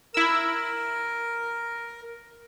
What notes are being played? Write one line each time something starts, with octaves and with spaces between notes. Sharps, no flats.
E4 A#4 E6